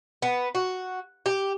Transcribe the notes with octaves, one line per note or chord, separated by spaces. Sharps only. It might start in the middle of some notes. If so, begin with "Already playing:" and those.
B3
F#4
G4